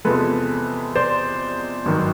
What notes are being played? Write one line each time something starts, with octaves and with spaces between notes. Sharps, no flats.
E2 C3 F3 G#3 A4 B4
C5 D5
G#1 G2 D#3 F#3